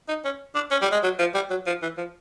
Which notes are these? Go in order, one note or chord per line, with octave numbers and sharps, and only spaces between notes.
D#4
C#4
D4
C#4
G3
G#3
F#3
F3
G3
F#3
F3
E3
F3